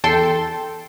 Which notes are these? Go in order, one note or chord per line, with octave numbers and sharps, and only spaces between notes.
E2 A4 G5 C6